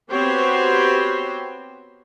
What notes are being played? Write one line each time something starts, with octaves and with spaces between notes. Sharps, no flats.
B3 C4 F#4 G4 C5 C#5